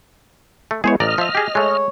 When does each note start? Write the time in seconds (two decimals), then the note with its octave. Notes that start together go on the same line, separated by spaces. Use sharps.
0.71 A3
0.84 G#3 B3 E4 G#4 C5 C#5
1.00 A1 D5 D#5 A#5 F6
1.18 F3 E5
1.35 G4 G#4
1.55 G#3 A3 C#5